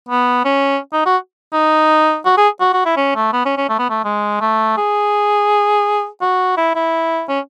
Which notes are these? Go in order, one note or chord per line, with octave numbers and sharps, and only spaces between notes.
B3
C#4
D#4
F#4
D#4
F#4
G#4
F#4
F#4
E4
C#4
A3
B3
C#4
C#4
A3
B3
A3
G#3
A3
G#4
F#4
E4
E4
C#4